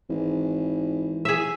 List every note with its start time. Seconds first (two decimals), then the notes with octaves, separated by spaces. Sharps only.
0.09 G#1 E3
1.25 G#4 E5